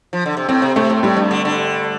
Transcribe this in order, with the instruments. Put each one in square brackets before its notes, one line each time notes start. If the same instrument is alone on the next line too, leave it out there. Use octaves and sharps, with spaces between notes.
[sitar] F3
D3
C3
[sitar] A2 [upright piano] C4
[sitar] C3
[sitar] C3 [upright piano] A3
[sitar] A2
[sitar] A2 [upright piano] G3
[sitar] G2
D3
D3